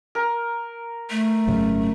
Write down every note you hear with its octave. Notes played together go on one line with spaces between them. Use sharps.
A#4
A3
G#1 F#2 C#3